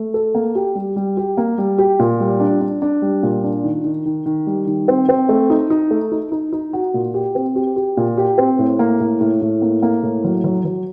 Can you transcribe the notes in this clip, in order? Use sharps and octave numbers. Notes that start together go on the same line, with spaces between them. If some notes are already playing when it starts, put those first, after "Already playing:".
Already playing: A3
A4
A#3
G4
G3
G3
G4
A#3
G3
G4
A#2
G3
D4
D4
D4
G3
A#2
D4
D#3
D#3
D#3
D#3
G3
D#3
C4
C4
A3
D#4
D#4
A3
D#4
D#4
D#4
F#4
A#2
G4
C4
G4
G4
A#2
G4
C4
A2
A#3
A2
A2
A2
A#3
A#3
A2
F#3
F#3
F#3